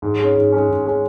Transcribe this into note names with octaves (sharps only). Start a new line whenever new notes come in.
G#2
G#3 C#4
G#2
G#3 C#4
G#2
G#3 C#4